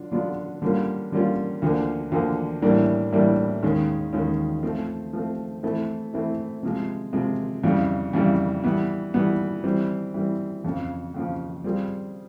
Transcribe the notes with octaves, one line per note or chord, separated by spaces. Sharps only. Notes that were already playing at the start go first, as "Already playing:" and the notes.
Already playing: D3 F#3 D4 F4
D3 F#3 B3 D4 F4
D3 G3 A#3 C#4 F4
D3 G3 A#3 C#4 F4
D2 D3 F3 A#3
D2 D3 F3 A#3
A2 E3 G3 A#3 D4
A2 E3 G3 A#3 D4
D#2 D#3 G#3 C#4
D#2 D#3 G#3 C#4
F3 A3 C4
F3 A3 C4
E3 A3 C4 E4
E3 A3 C4 E4
C3 F3 G#3
C3 F3 G#3
F2 C#3 E3 G3
F2 C#3 E3 G3
E3 G3 B3
E3 G3 B3
E3 G3 C4
E3 G3 C4
F2 C#3 F3
F2 C#3 F3
G3 C4 F4 G#4